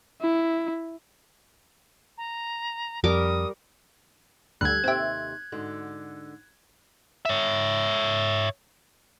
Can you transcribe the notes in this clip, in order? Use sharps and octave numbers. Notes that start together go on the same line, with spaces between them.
E4
A#5
F2 G3 A#4 D6 D#6
D2 G2 G4 A4 F#6 G#6
D#2 C3 C4 G4 E5
G#2 D3 F#4
C#5 E5